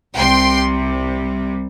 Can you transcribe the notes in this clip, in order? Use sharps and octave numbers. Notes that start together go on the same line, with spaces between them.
C2 C3 G3 G5 C6